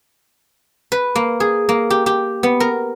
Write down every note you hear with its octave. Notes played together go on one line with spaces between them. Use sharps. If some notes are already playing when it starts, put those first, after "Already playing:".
B4
A#3
G#4
A#3
G4
G4
B3
A#4